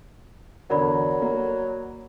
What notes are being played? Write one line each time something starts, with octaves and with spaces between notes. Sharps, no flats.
E2 D3 F#3 A#4 D5 B5
A#3